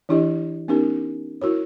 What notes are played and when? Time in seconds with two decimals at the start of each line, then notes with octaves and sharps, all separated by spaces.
0.09 E3 D4 E4 G4 D#5
0.68 B3 C#4 D#4 G4 A#4
1.41 E4 F#4 A#4 C#5